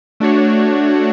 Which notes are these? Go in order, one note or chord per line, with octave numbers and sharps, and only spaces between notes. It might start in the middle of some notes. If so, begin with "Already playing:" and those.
A3 D4 F#4 C#5